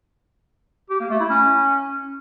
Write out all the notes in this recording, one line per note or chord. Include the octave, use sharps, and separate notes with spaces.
G4
A#3
A3
E4
C#4